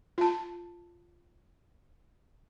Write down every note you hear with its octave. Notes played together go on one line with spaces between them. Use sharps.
F4 A5